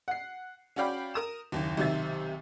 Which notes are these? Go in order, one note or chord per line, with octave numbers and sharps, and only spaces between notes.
F#5 C7
C#4 F#4 D5 F5 G5 B5
A#4 D#6 E7
F#1 D#2
B1 C3 D#3 E5 A6